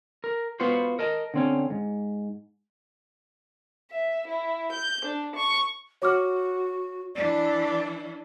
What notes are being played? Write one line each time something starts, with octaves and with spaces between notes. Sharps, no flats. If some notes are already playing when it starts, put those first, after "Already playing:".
A#4
B3 F4 F#4 B4 C5
A#4 D#5 A5
D3 C4 C#4
G#2
E5
E4
G6
D4
C#6
F#4 C#5 D6 F6
E3 D4 D5